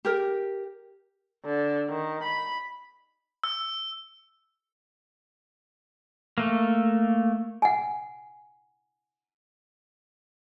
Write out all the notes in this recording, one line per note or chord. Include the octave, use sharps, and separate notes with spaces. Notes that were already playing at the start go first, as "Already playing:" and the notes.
G4 A#4
D3
D#3
B5
E6
A3 A#3
F#5 G#5